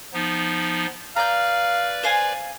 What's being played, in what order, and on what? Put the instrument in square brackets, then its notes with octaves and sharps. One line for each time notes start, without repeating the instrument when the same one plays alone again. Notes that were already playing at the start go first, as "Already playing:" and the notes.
[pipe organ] F3 B3 D#4
[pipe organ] B4 D5 [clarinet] F5 [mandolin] A#5 G6
[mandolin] C5 F5 G#5